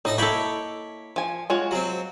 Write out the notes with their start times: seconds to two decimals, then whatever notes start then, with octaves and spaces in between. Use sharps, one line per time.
0.05 A2 D#4 D#5 A5
0.18 A#3 E4 A4 C#5 D#5 G5 B5
1.16 F3 G#5
1.50 G#3 F4 F#4 C#5 G#5
1.71 F#3 C4